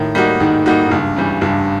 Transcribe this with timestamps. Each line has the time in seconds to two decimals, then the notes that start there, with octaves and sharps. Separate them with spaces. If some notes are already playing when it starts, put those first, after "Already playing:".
Already playing: A2 D#3
0.15 G3 A#3 D#4 F#4
0.40 G#2 D#3
0.66 G3 A#3 D#4 F#4
0.87 G#2
0.91 C#2 G2
1.16 C#3 E3 G3
1.41 C#2 G2